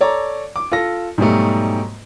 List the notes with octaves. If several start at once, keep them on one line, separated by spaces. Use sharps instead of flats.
A4 C#5 D5 A#5
D6
F4 A4 A#6
G#2 B2 F#3 G3 A3